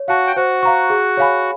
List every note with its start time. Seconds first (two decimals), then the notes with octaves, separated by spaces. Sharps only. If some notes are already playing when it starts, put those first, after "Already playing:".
Already playing: C#5
0.08 F#4 F5 F#5 A5
0.27 G5
0.36 F#4 C5 F#5
0.63 F5 A#5 C#6
0.90 G#4
1.17 C#5 F5 G#5 B5